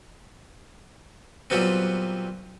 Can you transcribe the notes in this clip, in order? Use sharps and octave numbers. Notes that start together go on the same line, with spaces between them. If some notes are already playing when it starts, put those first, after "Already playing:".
A#2 F#3 G3 B3 C4